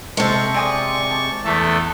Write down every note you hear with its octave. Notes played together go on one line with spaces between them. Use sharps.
C3 G#3 A4 C#6
C4 D5 G#5 D#6
A5
E2 E3 A3 A4